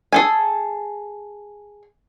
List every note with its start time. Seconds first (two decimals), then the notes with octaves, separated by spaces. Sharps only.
0.13 G#4 A4 G#5